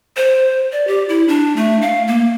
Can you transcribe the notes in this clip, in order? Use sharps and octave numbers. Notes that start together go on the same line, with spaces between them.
C5
D5
G4
E4
D4
A3
F5
A#3